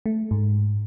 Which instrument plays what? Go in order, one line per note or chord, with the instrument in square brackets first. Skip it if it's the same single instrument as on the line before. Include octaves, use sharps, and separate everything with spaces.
[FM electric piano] A3
G#2